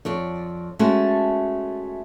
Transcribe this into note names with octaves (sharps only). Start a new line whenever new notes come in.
F2 C#5 D5
G#3 A3 C#4 F#4 A4